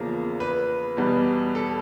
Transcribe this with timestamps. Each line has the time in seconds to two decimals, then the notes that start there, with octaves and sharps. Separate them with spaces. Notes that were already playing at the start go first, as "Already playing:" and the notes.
Already playing: E2 C#3 F3 A#3
0.40 B4
0.97 E2 B2 G3 B3
1.55 A4